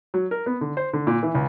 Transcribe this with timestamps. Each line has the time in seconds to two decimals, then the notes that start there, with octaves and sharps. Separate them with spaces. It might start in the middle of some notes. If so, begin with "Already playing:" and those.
0.14 F#3
0.31 A#4
0.46 B3
0.61 D3
0.77 C5
0.93 D3
1.07 A#2
1.23 E3
1.35 C#2